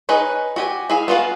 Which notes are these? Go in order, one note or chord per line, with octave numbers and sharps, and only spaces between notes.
D#4 G#4 B4 C#5
F#4 G4 G#5
E4 G#4 F5
B3 F4 F#4 F5